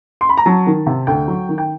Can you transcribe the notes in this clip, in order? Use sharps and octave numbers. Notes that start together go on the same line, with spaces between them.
C6
B5
A#5
F#3 A5
D#3
C3
D2 G5
F#3
D#3
G5